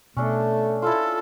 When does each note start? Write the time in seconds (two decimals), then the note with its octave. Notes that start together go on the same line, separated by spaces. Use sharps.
0.17 B2 A3 C#4 D4 A4
0.82 E4 F4 A4